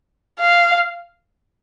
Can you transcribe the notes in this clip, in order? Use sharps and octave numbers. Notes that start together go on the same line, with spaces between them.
F5